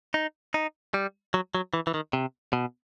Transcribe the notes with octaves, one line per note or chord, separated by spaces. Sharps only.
D#4
D#4
G3
F#3
F#3
E3
E3
D#3
C3
B2